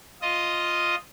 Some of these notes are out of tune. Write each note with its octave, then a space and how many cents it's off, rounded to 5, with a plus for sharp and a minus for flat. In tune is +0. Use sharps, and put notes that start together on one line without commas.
F4 +0 D#5 +0